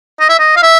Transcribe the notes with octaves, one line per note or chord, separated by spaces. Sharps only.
D#5
E5
D#5
F5
E5